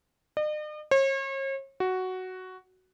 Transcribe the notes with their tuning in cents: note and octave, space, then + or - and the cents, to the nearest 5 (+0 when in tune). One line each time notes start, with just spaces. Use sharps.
D#5 -45
C#5 -40
F#4 +5